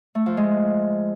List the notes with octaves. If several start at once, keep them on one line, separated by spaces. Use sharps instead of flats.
A3
F3
G#3